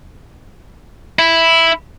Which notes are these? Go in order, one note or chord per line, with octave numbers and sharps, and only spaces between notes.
E4